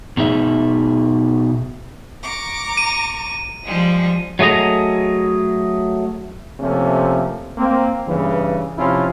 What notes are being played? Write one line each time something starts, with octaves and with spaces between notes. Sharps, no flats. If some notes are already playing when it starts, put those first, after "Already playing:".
B2 D#4 G#4 E5
A#5 C#6 D6
D#7
F3 G3 G#3
F#3 A3 G#4 D#5 A#5
C3 F3 A3 A#3 C#4
A#3 C4
G2 C#3 E3
C3 F3 C#4 E4 F4